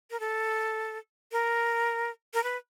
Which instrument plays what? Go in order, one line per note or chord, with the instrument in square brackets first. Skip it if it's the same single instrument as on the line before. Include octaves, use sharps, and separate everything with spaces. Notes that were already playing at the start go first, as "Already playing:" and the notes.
[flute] A#4
A4
A#4
A#4
B4